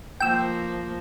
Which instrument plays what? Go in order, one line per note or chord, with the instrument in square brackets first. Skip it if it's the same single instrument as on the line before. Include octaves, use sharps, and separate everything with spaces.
[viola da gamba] F3 A#3 [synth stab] G5 E6